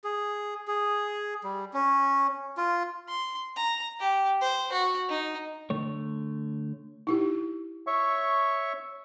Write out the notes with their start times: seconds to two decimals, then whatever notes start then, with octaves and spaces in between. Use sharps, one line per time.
0.04 G#4
0.68 G#4
1.44 G3
1.74 C#4
2.57 F4
3.09 C6
3.56 A#5
4.00 G4
4.41 C5
4.72 F#4
5.10 D#4
5.70 D3 A3 C#5
7.07 D#4 E4 G4
7.87 C#5 E5 C#6